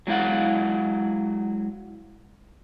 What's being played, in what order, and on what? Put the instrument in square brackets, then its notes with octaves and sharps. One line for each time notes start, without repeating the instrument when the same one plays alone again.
[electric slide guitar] F#3 G#3 E4 F5 F#5